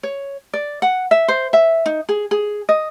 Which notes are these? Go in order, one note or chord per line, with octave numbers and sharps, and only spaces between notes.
C#5
D5
F#5
E5
C5
E5
D#4
G#4
G#4
D#5